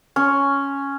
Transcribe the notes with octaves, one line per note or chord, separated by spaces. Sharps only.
C#4